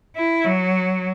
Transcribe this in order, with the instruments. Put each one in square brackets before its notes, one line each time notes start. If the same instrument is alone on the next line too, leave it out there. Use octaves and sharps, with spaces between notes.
[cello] E4
F#3